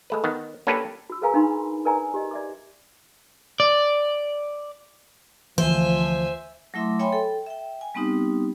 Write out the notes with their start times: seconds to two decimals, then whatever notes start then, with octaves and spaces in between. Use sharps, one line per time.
0.10 G#3 A3 B4
0.24 D#3 B3
0.67 A#3 C#4 D4 G4 A4 B4
1.10 F#4 E6
1.22 G#4 A#4 B4 F5 G#5 A#5
1.34 D4 D#4 F5 B5 C6
1.85 A#4 B4 D5 F5 G#5 A#5
2.14 G4 D#5
2.31 D5 E5 D6
3.60 D5
5.58 D2 E3 F3 C5 E5 G#5
6.74 F#3 A3 E4 E5 C6 D6
6.99 C#5 E5 G5 G#5 B5 C6
7.12 A4 G5
7.46 E5 G5
7.81 G#5
7.95 G3 B3 C4 D#4 G4